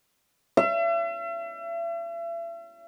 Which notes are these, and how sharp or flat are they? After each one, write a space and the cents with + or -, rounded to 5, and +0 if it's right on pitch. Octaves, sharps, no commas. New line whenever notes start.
E5 +40